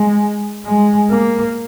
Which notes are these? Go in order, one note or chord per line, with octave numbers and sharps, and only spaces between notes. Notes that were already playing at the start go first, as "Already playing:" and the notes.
Already playing: G#3
G#3
A#3